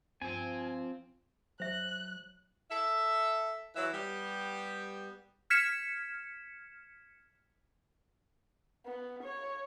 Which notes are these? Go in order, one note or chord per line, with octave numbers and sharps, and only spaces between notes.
G2 F3 C4 C5 G#5
F#3 C5 E5 F#6
A4 E5
E3 F#3 E5
G3 B3 G4
F6 G#6 B6 C#7 E7
B3
C#5